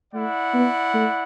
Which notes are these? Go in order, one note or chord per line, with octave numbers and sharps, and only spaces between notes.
A3 E4 D5 F#5
B3
A3